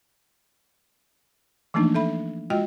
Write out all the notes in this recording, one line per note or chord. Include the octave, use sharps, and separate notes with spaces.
E3 F3 A3 A#3 D4 D#4
A4 E5 B5
G#3 F4 F#4 D#5 G5